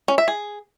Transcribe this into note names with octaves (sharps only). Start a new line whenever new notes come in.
C#4
E5
G#4